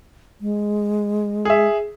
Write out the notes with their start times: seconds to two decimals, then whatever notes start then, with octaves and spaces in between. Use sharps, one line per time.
0.41 G#3
1.45 G#4 E5